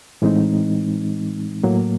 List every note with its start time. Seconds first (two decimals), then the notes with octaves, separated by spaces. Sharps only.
0.22 A2 E3 G#3 C4 D#4
1.63 A2 F#3 A#3